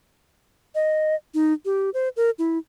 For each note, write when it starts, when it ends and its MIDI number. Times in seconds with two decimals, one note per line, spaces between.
0.75 1.15 75
1.34 1.53 63
1.65 1.90 67
1.94 2.09 72
2.17 2.30 70
2.39 2.58 64